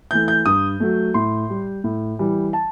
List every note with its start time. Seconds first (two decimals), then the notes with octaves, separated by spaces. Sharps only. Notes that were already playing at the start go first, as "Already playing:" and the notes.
0.11 E3 A3 G6
0.28 G6
0.46 G2 D#6
0.80 F#3 A3
1.14 A2 C6
1.50 G3
1.84 A2
2.19 E3 G3
2.53 A5